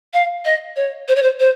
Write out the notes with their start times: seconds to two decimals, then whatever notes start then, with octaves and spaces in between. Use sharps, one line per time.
0.13 F5
0.45 D#5
0.76 C#5
1.08 C5
1.15 C#5
1.22 C5
1.40 C5